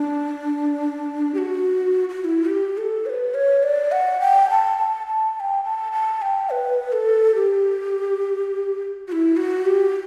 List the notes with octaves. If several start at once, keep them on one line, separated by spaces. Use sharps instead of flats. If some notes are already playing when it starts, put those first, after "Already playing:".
Already playing: D4
G4
F#4
F#4
F#4
E4
G4
A4
C#5
B4
C#5
D5
F#5
G5
A5
A5
A5
A5
G5
A5
A5
G5
B4
A4
G4
F#4
E4
F#4
G4